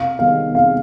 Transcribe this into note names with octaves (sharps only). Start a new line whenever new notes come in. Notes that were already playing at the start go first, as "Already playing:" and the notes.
Already playing: C3 F5
D#3 G3 B3 F5
C3 F5